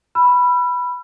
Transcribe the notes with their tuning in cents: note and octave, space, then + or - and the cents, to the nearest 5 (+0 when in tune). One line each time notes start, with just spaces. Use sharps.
B5 -5 E6 +45